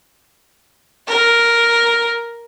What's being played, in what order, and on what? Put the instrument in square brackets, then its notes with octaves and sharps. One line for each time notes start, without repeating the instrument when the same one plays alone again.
[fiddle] A#4